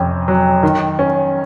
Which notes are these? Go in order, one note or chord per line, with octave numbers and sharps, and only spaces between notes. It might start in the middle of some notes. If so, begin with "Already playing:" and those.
Already playing: F2 C3 C#4
F#3
D#3
C#4